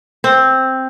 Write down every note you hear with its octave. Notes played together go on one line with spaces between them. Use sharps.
C4